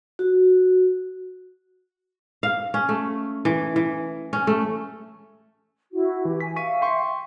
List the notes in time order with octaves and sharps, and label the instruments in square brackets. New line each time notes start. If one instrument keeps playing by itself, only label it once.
[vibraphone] F#4
[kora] F5
C#4
A3
E3
E3
C#4
A3
[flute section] E4 F#4
[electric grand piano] E3 [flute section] G4
[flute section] G#5 [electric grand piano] B6
[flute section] E5 F5 [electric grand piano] C#6 B6 D#7
[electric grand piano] G5 C6 C#6